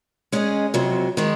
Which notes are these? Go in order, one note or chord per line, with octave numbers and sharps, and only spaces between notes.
G#3 C#4 G#4 D#5
F2 C3 F#3
D#3 G#3